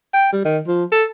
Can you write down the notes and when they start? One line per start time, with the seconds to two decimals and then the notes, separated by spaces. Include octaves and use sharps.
0.14 G5
0.32 G3
0.45 D#3
0.67 F3
0.92 A4